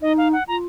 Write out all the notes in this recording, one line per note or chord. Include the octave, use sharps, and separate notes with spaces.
D#4 D#5
F5
F#5
F4 A#5